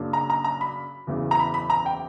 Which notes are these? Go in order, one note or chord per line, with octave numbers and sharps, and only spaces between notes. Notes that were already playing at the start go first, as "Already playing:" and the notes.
Already playing: F#2 C#3 F#3 A#3 D4
A#5
A#5
A#5
B5
F#1 E2 C#3 E3
A#5
B5
B5
A#5
G5